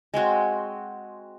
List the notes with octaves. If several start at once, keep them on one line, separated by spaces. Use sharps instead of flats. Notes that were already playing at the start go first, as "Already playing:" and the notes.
G#3 C4 F#4 C#5